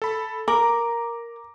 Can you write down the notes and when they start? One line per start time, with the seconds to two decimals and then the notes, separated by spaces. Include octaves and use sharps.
0.02 A4 B5
0.48 A#4 A#5 D6